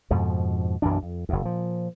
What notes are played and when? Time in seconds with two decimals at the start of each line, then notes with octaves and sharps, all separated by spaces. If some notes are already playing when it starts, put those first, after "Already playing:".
0.11 F2 G#2 B2 F3
0.82 B1 F#2 E3 D4
1.03 F2
1.29 F#1 E2
1.42 A#2 F3